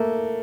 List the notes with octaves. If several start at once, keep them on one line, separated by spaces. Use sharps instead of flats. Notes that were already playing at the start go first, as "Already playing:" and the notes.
Already playing: A3 A#3